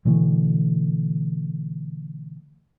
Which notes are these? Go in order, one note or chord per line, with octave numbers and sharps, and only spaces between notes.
B2 D3 E3 A3